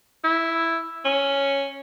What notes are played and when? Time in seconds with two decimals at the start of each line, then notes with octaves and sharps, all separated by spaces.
0.24 E4
1.05 C#4